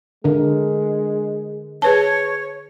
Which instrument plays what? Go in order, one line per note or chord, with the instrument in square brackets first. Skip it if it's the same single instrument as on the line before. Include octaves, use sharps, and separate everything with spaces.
[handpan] D3 A#4 [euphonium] G#3
[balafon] G#4 B4 A5 [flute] C#5